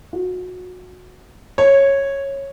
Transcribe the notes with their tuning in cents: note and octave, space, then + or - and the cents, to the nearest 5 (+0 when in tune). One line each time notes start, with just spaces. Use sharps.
F#4 -25
C#5 -10